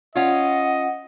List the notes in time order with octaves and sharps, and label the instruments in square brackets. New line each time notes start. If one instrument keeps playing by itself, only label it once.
[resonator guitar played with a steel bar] C#4 F4 [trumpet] D#5 [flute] F#5